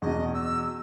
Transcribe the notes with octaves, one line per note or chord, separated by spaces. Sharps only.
E2 B2 D#5
E6